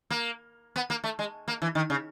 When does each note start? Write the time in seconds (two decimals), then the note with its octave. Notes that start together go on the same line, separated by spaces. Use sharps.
0.10 A#3
0.76 B3
0.90 A#3
1.04 A3
1.19 G#3
1.48 A#3
1.62 E3
1.75 D#3
1.90 C#3